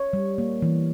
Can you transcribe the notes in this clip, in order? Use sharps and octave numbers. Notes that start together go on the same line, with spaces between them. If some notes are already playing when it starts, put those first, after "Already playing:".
Already playing: C#5
G3
A#3
E3